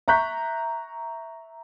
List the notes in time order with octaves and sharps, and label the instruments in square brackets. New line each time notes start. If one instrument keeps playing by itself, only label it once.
[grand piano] E5 A#5 C#6 F#6 G6 B6